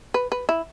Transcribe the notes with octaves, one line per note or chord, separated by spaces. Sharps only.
B4
B4
E4